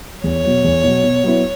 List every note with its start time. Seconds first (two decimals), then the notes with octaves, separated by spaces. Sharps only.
0.24 E2 C#5
0.44 B2 F#3
0.64 E2
0.84 B2 F#3
1.04 B2
1.24 F#3 B3 E4